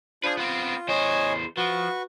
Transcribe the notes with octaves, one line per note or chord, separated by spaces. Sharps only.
D4 F4 G#4 B4 C5
B3 C4 F4
E2 C5 C#5 D#5 G#5
F3 F#4 B4 C#6